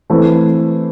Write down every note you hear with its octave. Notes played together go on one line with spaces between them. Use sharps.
E3 A3 C4 E4